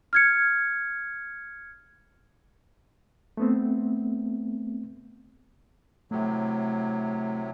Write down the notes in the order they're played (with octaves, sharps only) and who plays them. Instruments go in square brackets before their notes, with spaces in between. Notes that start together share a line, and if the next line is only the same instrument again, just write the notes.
[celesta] F6 G#6 C#7
[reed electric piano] A3 B3 C4
[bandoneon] A2 C3 F#3 [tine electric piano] A3